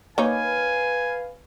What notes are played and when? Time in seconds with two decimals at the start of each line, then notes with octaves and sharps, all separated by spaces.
0.18 A#3 D#4 B4 C#5 F5 G#5